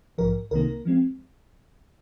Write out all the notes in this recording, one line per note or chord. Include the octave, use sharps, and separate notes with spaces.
A#1 G#2 F3 A#4
C2 C3 D#3 A#3 A#4
F3 G#3 C4